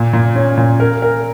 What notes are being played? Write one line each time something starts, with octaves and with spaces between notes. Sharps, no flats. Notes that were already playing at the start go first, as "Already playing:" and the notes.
Already playing: A#2
A#2
C#4
A#2
A#4
A#4